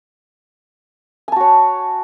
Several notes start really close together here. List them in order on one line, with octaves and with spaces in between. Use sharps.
G#5 A5 F#4 C#5